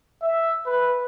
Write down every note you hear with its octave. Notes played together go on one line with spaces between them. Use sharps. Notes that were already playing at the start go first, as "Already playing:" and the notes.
E5
B4